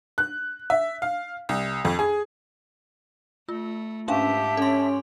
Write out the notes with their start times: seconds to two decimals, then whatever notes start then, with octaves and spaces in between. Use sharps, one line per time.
0.18 F#6
0.70 E5
1.02 F5
1.49 C2
1.85 F2
1.99 G#4
3.49 A3 F4
4.08 G#2 C#4 D4 G4 E5 F5 A5
4.57 C#4 A4 C6